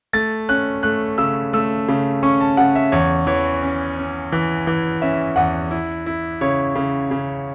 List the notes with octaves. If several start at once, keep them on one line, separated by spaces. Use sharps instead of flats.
A3 A6
C#4 F#6
A3 F#6
C#3 E6
A3 E6
C#3
C#4 C#6
A5
C#3 F#5
E5
E2 C#5
E3 C#5
C#4
C#4
E3
E3
C#4 E5
E2 F#5
E4
E4
C#3 C#5
C#3
C#3